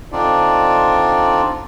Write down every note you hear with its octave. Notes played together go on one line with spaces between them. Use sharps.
D3 C4 D4 D#4 F4 D5